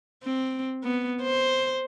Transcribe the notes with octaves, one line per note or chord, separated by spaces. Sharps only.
C4
B3
C5